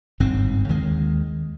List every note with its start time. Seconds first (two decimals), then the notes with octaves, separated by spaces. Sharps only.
0.20 G1 G#2 C4
0.69 D#2 D#3 G#3